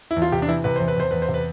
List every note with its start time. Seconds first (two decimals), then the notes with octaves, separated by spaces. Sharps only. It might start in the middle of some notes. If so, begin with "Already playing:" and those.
0.11 E4
0.17 E2
0.22 F4
0.32 C3 G4
0.42 D4
0.48 E3 E4
0.64 C3 B4
0.76 E2 C5
0.88 B4
0.96 E2 C5
1.11 E2 B4
1.22 C5
1.28 C3
1.34 B4